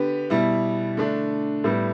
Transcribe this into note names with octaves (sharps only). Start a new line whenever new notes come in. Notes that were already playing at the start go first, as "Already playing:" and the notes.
Already playing: D3 B3 G4 B4
B2 G3 E4
D3 A3 D4
A2 G3 B3